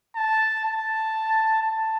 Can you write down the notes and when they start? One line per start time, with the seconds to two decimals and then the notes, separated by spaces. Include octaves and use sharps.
0.16 A5
0.65 A5
1.62 A5